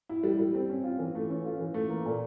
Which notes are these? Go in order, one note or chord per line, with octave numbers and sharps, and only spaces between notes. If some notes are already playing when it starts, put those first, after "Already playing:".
E4
G3
G3
C4
C#4
F4
E3
A3
C#4
F4
E3
A3
A#3
A#2